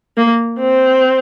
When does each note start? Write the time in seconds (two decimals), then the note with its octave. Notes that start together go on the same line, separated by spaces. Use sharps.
0.17 A#3
0.60 C4